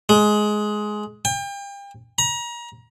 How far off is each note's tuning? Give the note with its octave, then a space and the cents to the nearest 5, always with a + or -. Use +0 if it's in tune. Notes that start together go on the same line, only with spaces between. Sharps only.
G#3 +15
G5 +35
A#5 +30